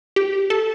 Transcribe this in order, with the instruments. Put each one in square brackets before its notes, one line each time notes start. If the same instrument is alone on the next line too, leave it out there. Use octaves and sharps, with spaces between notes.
[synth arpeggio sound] G4
A4